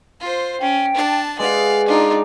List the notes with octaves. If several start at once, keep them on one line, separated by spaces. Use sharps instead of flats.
F4 C5
C#4 G5
D4 A5
G#3 G#4 B4 D5 F5 F#5
D4 D#4 F4 D5